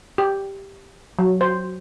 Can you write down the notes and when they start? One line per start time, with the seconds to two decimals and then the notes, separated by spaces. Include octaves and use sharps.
0.18 G4
1.19 F#3
1.41 C5